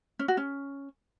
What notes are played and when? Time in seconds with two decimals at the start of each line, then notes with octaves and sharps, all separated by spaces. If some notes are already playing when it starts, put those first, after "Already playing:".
0.19 C#4
0.28 F#4
0.37 C#4